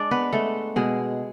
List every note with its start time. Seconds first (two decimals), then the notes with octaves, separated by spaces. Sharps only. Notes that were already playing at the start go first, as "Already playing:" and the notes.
Already playing: G#3 D4 D5
0.11 B3 B4
0.32 G#3 A3 A4
0.76 B2 G#3 G#4